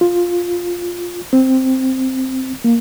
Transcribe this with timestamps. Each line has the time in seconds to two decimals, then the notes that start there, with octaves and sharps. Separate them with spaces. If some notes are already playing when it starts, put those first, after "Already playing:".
0.01 F4
1.33 C4
2.64 A#3